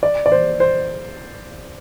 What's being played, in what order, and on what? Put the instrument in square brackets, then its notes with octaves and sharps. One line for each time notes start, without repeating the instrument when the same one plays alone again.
[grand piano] D5
D5
C5
C5